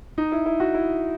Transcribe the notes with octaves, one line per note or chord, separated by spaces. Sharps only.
D#4
E4
E4
F#4
E4